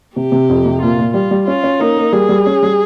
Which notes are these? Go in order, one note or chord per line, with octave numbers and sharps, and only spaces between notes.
C3 G4
C3
F2
C3
A#2 F4
A#2
G3 F4
G3
C#4 F4
C#4
A#3 D#4
A#3
G3 G#4
G3
C#4
G3